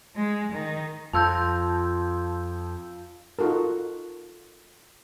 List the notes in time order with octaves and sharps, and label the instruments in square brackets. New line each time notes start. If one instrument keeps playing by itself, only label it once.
[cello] G#3
D#3
[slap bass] F2 [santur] F4 [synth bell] A5 E6 G6
[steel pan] D#4 F4 F#4 A4 A#4